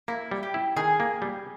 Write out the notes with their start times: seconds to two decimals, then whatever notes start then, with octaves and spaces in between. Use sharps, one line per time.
0.08 A#3 E4
0.31 G3
0.43 G4
0.54 E4
0.77 D#3 G#4
1.00 A#3
1.22 G3